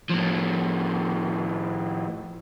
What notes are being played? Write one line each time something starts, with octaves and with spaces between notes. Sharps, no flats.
A2 F3